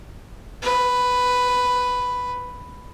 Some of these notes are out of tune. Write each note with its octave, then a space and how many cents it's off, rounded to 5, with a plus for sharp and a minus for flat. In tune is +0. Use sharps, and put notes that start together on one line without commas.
B4 +5